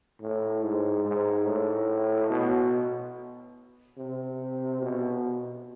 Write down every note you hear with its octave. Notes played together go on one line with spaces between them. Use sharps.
A2
G#2
G#2
A2
B2
C3
B2